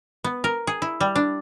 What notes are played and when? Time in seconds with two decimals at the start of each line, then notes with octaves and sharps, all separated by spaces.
0.24 B3
0.44 A#4
0.67 G#4
0.82 E4
1.01 G3
1.16 D4